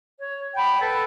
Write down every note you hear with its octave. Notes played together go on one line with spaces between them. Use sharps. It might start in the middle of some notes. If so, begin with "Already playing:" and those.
C#5
F#5 G5 B5
A4 B4